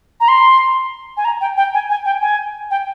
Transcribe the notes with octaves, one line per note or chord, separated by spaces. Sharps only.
A#5
C6
G#5
A#5
G5
G5
G#5
G#5
G5
G#5
G5